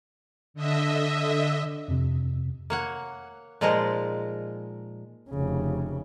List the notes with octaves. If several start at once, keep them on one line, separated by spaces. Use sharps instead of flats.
D3 D#5 E5
F2 C3
A#3 C#5 F#5
A#2 F3 G#3 D#4 F4 A#4
F1 C#3